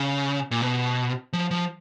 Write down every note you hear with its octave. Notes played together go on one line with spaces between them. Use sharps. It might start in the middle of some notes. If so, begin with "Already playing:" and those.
Already playing: C#3
A#2
B2
F3
F3